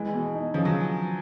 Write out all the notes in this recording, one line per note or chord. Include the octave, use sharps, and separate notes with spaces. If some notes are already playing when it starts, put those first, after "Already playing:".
Already playing: E3 G#3
B2
D#4
C#3 F3
F#3